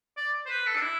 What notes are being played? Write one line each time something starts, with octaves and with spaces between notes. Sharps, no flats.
D5
C5
B4
A4
D4
E4